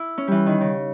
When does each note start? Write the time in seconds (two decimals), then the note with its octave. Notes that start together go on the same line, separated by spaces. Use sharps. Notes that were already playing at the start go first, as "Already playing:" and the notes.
Already playing: E4
0.18 C#4
0.28 E3 G3
0.46 D#3
0.61 C#3